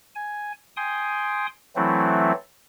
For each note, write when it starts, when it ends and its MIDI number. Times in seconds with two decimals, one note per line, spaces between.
0.15 0.52 80
0.77 1.47 79
0.77 1.47 80
0.77 1.47 84
0.77 1.47 87
1.76 2.32 52
1.76 2.32 54
1.76 2.32 57
1.76 2.32 60
1.76 2.32 64